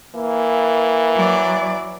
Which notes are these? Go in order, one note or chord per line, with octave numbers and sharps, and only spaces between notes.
E3 A#3
F#3 D5